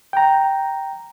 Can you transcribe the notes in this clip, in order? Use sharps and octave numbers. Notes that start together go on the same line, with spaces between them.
G5 A#5